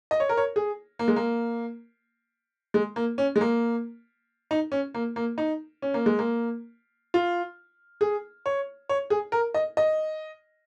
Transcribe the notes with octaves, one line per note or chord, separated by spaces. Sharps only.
D#5
C#5
A#4
C#5
G#4
A#3
G#3
A#3
G#3
A#3
C#4
G#3
A#3
D#4
C#4
A#3
A#3
D#4
C#4
A#3
G#3
A#3
F4
G#4
C#5
C#5
G#4
A#4
D#5
D#5